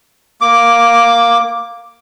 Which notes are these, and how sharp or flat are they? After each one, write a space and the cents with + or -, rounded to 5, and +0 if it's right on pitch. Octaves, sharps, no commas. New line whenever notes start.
A#3 +0 D6 +0